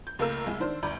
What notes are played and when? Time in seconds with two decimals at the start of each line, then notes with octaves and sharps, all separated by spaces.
0.07 G6
0.19 C#2 A3 A#3 A#4 E6
0.46 C2 G#3
0.60 D#3 D4 C5
0.83 G1 D2 D5 A#5 B5 G6